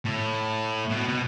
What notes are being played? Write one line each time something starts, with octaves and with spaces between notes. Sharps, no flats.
A2
B2
B2